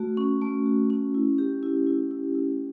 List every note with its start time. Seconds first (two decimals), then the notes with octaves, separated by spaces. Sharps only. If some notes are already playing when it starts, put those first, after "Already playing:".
Already playing: A3 F#4
0.17 C#4
0.41 A3
0.66 F#4
0.90 C#4
1.14 E4
1.38 G4
1.63 E4
1.87 E4
2.11 E4
2.35 E4